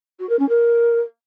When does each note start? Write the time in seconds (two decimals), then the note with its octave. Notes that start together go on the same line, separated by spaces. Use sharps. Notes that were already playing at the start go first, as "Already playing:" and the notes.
0.19 F#4
0.29 A#4
0.39 C#4
0.49 A#4